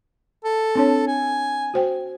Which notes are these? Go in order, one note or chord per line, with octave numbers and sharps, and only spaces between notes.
A4
C4 D4 C#5
G#5
F#4 C5 G5